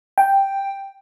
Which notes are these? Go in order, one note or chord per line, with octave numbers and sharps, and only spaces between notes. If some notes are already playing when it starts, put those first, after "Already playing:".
G5